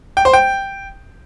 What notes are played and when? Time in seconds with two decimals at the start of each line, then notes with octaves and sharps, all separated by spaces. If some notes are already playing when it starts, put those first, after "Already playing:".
0.17 G5
0.25 C5
0.33 G5